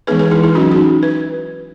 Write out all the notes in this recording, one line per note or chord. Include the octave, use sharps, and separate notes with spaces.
E3 G#3 B3 D#4 G#4 B4
G#4 B4
E4 G#4
E4 G#4
F#3 C#4 D#4 F#4
D#4 F#4
B4